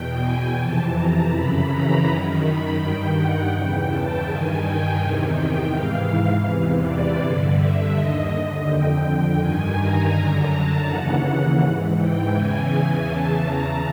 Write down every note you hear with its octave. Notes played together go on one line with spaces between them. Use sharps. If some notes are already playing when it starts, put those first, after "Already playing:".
Already playing: E2 B2 G5
G#5
F2 C3 E3 A5
A#5
F#2 C#3 E3 B5
A#5
F#2 D#3
B5
G2 D#3 G5
F#5
E2 C#3 E3 G5
A5
G2 D#3 G#5
G5
E2 C3 D#3
G5
G#2 E3 F5
E2 C3 E3
D5
G2 D3
E5
D#2 D3 D#5
F2 D3 G5
G2 D#3 G#5
A#5
F#2 D3 A#5
A5
D#2 C#3 E3 F#5
G#2 E3
G5
E2 C#3 E3 G#5
E2 C#3 E3 A5
A#5